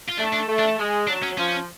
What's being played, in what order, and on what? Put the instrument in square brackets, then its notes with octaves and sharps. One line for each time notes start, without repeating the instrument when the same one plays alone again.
[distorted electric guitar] F4
[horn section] A3 [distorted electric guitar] D4
[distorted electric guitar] D4
[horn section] A3
[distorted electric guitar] D4
[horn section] G#3
[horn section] F#3 [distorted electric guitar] D4
[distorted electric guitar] C#4
[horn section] F3 [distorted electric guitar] C#4